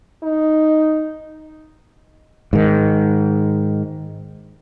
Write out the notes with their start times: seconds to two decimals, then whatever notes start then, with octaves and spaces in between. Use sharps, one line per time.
0.23 D#4
2.53 G#2 D#3